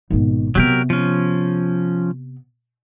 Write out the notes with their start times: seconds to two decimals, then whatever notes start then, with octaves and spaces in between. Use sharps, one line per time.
0.10 G#1 B2
0.55 C3 F#3 B3 G4 A#4
0.90 F3 C#4